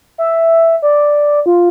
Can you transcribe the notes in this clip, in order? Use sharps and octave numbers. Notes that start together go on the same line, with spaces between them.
E5
D5
F4